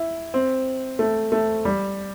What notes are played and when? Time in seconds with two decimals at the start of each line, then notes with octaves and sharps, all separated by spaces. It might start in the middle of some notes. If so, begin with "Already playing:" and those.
Already playing: E4
0.34 C4
0.99 A3
1.32 A3
1.65 G3